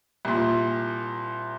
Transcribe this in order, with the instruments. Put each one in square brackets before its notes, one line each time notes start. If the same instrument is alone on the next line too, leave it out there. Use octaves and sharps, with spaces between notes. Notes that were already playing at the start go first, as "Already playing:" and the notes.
[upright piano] C2 A#2